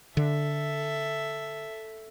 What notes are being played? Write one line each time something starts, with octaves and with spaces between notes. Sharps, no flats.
D3 A4 E5